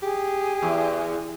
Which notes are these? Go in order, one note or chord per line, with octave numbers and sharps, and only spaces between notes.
G4 G#4
E2